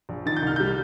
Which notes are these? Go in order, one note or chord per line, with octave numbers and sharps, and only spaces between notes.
A#1
D#3 A6
G6
C2 F6
G3 G6